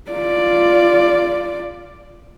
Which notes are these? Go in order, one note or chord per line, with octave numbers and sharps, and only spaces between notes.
F4 D5